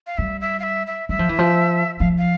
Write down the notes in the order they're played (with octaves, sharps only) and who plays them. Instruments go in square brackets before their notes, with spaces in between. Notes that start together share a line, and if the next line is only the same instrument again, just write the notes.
[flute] F5
[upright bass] G3 [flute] E5
[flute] E5
F5
E5
E5
[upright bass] G3 [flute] E5
[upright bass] F3
E3
F3
[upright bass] F3 [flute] F5
[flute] F5